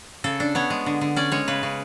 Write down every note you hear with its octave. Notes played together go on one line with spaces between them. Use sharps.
C#3 A4
D4
B3 C#5
G#3
D3
D3
C#4 D5
G#3 C#5
C#3 B4
C#3